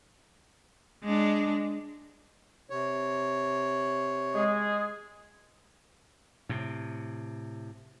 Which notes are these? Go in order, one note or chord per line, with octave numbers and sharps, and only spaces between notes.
G#3 D4
C3 C#5
G#3 G#4
A2 C3